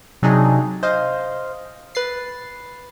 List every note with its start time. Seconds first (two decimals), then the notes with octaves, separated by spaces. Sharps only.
0.22 C3 F#3 D4 D#4 G#4
0.83 C5 D#5 F5
1.95 B4 A6 C7